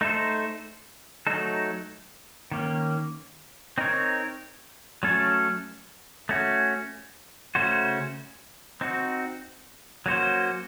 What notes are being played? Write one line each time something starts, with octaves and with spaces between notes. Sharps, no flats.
A3 D#4 A4 C5
F#3 A3 D#4 A4
D#3 A#3 C#4
C4 D#4 A#4 C#5
F#3 A3 C#4 A4
A3 C#4 F#4
C#3 A3 C#4 F#4 C5
C4 D#4 F#4
F#3 A#3 C#4 F#4 C5